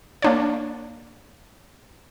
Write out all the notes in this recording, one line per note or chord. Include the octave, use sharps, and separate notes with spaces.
A#3 D4 C#5